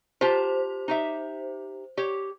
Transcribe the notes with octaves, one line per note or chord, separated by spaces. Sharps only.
F4 G4 C5 A5
D#4 G4 E5
G4 C#5